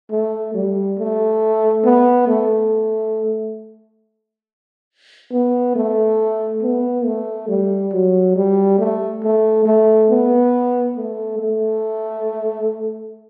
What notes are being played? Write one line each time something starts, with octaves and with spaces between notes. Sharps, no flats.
A3
G3
A3
B3
A3
B3
A3
B3
A3
G3
F#3
G3
A3
A3
A3
B3
A3
A3